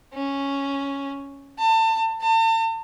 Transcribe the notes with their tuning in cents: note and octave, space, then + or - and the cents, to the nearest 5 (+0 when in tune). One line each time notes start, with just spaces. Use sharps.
C#4 +0
A5 +30
A5 +35